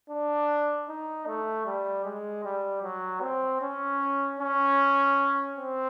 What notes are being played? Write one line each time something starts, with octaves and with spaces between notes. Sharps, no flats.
D4
D#4
A3
G3
G#3
G3
F#3
C4
C#4
C#4
C4